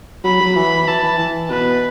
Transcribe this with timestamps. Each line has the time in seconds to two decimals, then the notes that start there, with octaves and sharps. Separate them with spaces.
0.24 F#3 B5
0.41 F#3
0.56 E3 B5
0.88 E3 A5
1.03 E3
1.19 E3
1.51 B2 B4